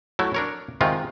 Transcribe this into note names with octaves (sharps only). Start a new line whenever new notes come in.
F#3 A3 E4
D4 A#4 C#5
C3 D#3 G#3 F4